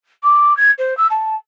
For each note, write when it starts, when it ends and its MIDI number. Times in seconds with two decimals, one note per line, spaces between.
0.24 0.56 86
0.57 0.71 92
0.78 0.96 72
0.97 1.07 88
1.10 1.35 81